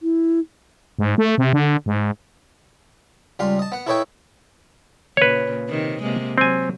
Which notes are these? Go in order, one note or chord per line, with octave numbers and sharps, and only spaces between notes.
E4
G#2
A3
C3
D3
G#2
C#2 G3 F4 C6
D#5 A5
B3 F#5
E4 A4 B4 C#5 D#5 G5
A#2 C#3 B4 C#5
C3 D#3
C3 G#3 A#3
F#3 C4 G#5